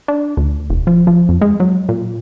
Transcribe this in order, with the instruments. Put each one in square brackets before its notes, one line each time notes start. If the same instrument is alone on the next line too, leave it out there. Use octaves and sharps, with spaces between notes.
[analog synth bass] D4
D2
E1
F3
F3
F2
G#3
F#3
A#2